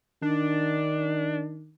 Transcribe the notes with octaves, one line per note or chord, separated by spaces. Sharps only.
D#3 D4